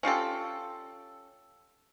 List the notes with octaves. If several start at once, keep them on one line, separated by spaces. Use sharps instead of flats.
C#4 F4 G4 A4